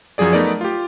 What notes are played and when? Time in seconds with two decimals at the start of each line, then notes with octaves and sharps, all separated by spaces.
0.18 F#2 F3 F#3 G#4 D5
0.33 A3 B3 D#4 A#4 D5
0.61 F4 G4